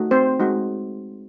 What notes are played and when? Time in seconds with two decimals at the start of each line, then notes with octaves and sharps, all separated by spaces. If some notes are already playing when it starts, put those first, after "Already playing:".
Already playing: A3 D#4 F#4
0.11 C4 C5
0.40 G#3 D#4 F#4